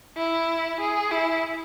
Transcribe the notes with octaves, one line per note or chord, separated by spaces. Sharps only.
E4
G#4
E4